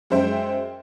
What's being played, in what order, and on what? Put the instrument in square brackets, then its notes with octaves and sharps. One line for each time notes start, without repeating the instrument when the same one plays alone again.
[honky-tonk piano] F#2 G#3 C5 E5 G5